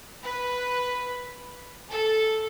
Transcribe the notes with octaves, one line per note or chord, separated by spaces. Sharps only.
B4
A4